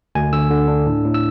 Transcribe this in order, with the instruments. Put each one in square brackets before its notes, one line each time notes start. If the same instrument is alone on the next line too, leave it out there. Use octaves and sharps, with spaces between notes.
[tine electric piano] D2 G#5
D3 E6
D3
D4
A2
A2
E6